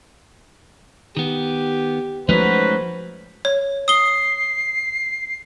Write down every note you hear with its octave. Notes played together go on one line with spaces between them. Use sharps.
D#3 B3 G4
F3 F#3 G#3 A3 C#4 D#4 B4 C5
C#5
D#6 C7 G7